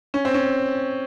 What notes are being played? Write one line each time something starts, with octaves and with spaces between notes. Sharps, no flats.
C#4
C4
C#4